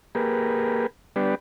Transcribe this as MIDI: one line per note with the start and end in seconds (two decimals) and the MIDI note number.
0.15 0.86 58
0.15 0.86 67
0.15 0.86 68
0.15 0.86 70
0.15 0.86 71
1.16 1.35 55
1.16 1.35 59
1.16 1.35 62
1.16 1.35 67
1.16 1.35 71
1.16 1.35 74